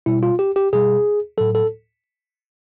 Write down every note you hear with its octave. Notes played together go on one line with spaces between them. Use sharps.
B2 G3 E4
F4
G4
G4
B2 G3 G#4
A2 F#3 A4
A4